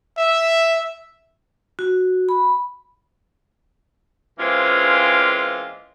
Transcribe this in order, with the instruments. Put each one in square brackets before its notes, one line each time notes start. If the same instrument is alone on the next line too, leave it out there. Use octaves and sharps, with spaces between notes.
[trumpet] E5
[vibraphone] F#4
B5
[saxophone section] E3 G#3 A#3 C4 C#4 F4